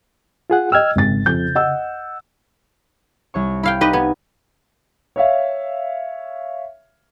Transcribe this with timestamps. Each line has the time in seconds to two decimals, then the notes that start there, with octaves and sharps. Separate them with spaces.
0.50 F4 G#4 F#5
0.72 D#5 G5 E6 F6 G#6
0.96 G#1 C#3 A6
1.26 F2 G6
1.55 D#5 F#5 E6
3.34 C2 C#5 C#6
3.63 E4 F5 G5
3.81 D#4 G4 B4 D#5
3.93 B3 G#6
5.16 C#5 E5 F5